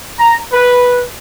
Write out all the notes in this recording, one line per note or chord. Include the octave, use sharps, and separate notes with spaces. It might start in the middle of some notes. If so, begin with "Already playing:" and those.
A#5
B4